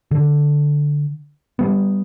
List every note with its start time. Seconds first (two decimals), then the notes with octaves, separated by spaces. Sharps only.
0.11 D3
1.59 G3 B3